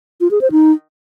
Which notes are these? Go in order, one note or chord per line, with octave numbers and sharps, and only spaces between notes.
F4
G#4
C5
D#4